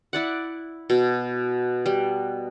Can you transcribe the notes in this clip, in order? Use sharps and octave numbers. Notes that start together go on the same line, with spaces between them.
E4 D5 F#5
B2
G3